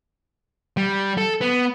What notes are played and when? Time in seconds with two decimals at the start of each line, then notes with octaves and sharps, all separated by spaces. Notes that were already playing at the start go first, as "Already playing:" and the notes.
0.77 G3
1.18 A4
1.41 B3